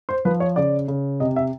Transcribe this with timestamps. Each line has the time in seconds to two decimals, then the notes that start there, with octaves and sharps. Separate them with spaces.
0.09 C5
0.25 F3 B4
0.40 C#5
0.56 C#3 D5
0.88 C#3
1.20 C3 D#5
1.36 E5